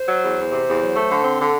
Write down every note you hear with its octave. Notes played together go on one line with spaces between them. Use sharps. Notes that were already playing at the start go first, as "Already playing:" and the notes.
Already playing: C5
F#3
E2
E2
C3
E2
F#3
A3
D3
C4
D3